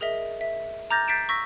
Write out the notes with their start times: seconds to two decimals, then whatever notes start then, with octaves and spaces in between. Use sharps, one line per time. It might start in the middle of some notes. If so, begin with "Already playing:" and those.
0.01 G#4 A#4 D#5 E5
0.41 E5
0.90 A#5 D6 F6 G6 A6 A#6
1.08 G6 A6 B6 C7 D7 E7
1.29 C#6 E6 A#6 B6